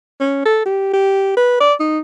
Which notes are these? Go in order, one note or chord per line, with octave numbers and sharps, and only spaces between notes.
C#4
A4
G4
G4
B4
D5
D#4